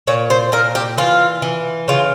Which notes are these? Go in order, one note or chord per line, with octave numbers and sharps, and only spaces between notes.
A#2 C#5
C5
A#2 A#4
G4
E3 F4
E3
C#3 F4